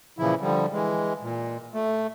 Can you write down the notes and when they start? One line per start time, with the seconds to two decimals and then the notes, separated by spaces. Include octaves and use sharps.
0.18 A#2 C#3 E3 F3 E4
0.40 D3 F3 G3
0.71 E3 G#3
1.21 A#2
1.73 A3